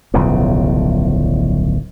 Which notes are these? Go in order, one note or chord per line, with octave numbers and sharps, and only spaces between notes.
D1 B1 C#3 F3